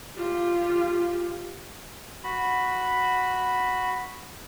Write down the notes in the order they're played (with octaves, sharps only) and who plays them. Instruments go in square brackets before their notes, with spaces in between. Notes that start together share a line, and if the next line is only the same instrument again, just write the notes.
[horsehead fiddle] F4 G4
[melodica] F#4 B5